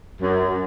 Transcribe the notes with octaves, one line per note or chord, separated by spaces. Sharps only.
F#2